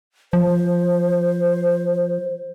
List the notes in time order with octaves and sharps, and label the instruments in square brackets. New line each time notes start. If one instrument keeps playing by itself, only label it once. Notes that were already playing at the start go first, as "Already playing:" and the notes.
[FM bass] F3 [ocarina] C5